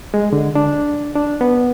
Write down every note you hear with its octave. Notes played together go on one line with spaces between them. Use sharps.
G#3
D3
D4
D4
B3